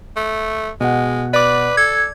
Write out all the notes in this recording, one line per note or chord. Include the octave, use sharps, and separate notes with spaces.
A3
B2 G#3 F#5
B4 D5 D6
A4 G#6